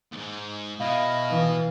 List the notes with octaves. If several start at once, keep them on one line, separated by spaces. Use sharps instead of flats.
D#2 G#2
B2 E4 D#5 F5
E3